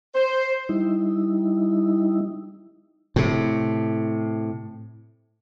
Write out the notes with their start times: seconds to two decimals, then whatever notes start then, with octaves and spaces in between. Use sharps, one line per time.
0.14 C5
0.69 G3 D#4 E4
3.16 A2 C3